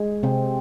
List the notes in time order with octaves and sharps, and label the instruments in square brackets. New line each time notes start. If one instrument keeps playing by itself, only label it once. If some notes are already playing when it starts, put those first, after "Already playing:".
Already playing: [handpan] G#3 G#4
C3 C4